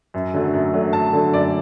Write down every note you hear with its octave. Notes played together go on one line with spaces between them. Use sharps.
F#2
D3 F#3 A3
F#2
D3 F#3 A3
F#2 A5
D3 F#3 A3
F#2 D5